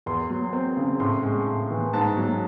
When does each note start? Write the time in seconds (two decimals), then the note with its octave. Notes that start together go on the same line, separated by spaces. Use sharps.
0.06 E2 C6
0.30 F#3
0.53 C4
0.77 C#3
1.00 A2 C6
1.23 G#3
1.46 A2
1.71 E3
1.93 G#2 A5
2.17 F#3